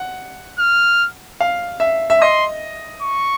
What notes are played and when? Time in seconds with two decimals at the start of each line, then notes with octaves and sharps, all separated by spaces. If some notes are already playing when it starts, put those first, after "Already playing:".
Already playing: F#5
0.59 F6
1.40 F5
1.80 E5
2.10 E5
2.21 D#5 C6
3.02 C#6